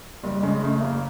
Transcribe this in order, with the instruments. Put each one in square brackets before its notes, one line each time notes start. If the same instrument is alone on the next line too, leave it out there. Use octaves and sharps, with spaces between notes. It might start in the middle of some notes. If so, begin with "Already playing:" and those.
[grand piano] F#1 [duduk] G3
[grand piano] C#3 [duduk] G#3
[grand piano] C#3 [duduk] A3
[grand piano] F#1 [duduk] A#3